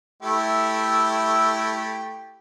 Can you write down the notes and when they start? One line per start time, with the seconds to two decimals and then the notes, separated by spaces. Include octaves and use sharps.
0.22 A3 E4 G4